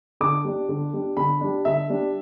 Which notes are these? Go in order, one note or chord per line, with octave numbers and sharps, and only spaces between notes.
D3 D6
G3 D4
D3
G3 D4
D3 B5
G3 D4
D3 E5
G3 D4